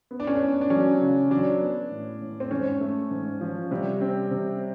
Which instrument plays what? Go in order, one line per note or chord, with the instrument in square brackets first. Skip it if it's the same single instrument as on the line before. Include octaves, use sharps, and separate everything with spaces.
[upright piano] B3
[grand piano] D4
C#4
D4
[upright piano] B3
[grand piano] D4
[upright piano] F#3 [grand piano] C#4
[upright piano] C#3
[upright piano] F#3 [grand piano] D4
[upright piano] B3
A2
A2
[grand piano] C4
[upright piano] G#2 [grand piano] C#4
[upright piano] A3
G#2
F3
[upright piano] C3 [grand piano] G3
[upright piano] C4
C3